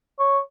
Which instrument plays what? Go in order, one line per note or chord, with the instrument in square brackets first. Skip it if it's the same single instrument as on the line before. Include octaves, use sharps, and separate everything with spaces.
[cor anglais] C#5